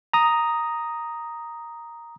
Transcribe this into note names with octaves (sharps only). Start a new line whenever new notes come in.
A#5 D#6